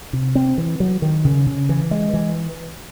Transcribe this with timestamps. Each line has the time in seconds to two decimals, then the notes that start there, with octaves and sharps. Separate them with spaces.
0.13 C3
0.35 C4
0.58 E3
0.80 F#3
1.02 D#3
1.25 C#3
1.46 C#3
1.69 E3
1.91 G#3
2.13 E3